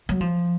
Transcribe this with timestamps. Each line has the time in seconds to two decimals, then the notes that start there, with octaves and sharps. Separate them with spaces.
0.09 F#3
0.21 F3